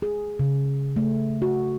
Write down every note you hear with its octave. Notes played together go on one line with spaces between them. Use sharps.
G#4
C#3
A3
F#4